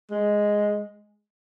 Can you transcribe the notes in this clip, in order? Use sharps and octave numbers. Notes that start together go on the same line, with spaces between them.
G#3